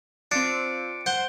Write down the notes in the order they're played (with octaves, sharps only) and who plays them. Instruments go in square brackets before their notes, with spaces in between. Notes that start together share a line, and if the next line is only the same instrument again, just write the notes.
[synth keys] C4 F4 [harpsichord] D4 [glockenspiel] C#7 D7
[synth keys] C5 [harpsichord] F#5 [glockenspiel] G6 G7